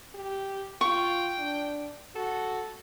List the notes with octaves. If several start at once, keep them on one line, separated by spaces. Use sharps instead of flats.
G4
F4 G5 C#6
D4
F#4 A4